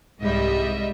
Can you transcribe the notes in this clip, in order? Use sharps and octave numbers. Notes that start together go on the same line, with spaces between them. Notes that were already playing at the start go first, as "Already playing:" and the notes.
C2 G#2 G3 D#5 E5